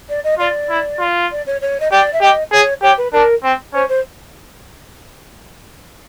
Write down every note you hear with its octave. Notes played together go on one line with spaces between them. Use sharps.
D5
D#5
F4 D5
E4
F4
D5
C#5
C#5
D#5
G4 D5
E5
G4 D#5
G#4 C#5
G4 C#5
B4
D4 A#4
C4
C#4 C5
C5